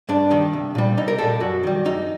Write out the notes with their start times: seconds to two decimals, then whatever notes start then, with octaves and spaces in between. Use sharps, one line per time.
0.09 G2 D4
0.31 D#3 G3
0.53 C2
0.75 A#2 G3
0.97 C2 D#4
1.08 A#4
1.18 A#2 G3 A4
1.40 F#2 F#4
1.63 D#3 G3
1.85 F#2 D#4